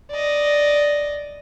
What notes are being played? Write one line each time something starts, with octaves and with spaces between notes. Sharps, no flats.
D5 D#5